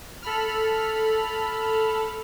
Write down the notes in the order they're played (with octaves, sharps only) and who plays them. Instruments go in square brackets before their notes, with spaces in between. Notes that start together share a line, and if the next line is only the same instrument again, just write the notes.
[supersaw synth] A4 B5 F6